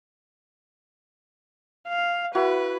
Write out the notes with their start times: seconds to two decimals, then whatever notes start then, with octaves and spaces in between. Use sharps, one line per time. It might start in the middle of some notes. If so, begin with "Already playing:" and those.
1.89 F5
2.35 E4 F#4 B4